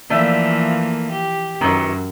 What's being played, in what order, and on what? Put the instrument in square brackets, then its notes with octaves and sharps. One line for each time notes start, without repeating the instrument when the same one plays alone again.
[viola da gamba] E3 F3 A#3 [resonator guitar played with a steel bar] A3 D5 E5
[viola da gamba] G4
[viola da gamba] F#2 [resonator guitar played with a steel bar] D#3 E3 F#3